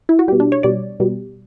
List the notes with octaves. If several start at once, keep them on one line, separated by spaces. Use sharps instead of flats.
E4
F#4
B2 G3 G4
D4
C#5
B2 G3 D5
B2 G3